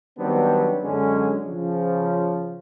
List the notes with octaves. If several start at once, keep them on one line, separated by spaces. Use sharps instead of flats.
D#3 F#3 G3 B3 C4 D4
F#2 D3 F#3 G#3 C#4
C#3 F3